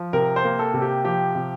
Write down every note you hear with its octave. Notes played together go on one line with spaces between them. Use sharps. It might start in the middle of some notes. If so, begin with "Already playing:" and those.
Already playing: F3
C3 A#4
C5
A#3
A4
C3
G4
F3 G4
C3